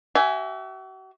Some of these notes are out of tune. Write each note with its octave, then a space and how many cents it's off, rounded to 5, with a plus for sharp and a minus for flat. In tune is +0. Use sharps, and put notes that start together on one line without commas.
F#4 +45 E5 +0 G#5 +0